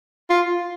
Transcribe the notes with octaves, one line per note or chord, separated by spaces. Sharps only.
F4